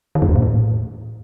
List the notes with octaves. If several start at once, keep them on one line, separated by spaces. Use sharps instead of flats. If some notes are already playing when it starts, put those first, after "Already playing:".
D#3
F#2
E2
A#2
A2